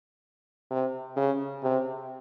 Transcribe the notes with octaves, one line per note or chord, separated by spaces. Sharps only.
C3
C#3
C3